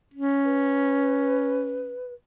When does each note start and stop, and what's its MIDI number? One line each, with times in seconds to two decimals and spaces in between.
0.14 1.95 61
0.44 2.14 71